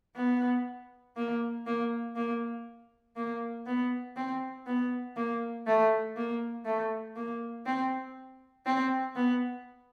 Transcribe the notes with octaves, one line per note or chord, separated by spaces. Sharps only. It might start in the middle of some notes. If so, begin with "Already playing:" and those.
B3
A#3
A#3
A#3
A#3
B3
C4
B3
A#3
A3
A#3
A3
A#3
C4
C4
B3